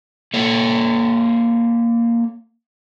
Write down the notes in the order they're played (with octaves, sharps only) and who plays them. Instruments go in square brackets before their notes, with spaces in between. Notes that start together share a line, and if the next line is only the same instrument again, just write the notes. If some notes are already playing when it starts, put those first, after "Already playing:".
[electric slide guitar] A#3 A4 C#5